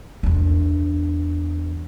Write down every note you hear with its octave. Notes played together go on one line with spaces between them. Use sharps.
E2 D4